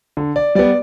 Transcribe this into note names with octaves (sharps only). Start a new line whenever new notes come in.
D3
D5
G3 B3 D5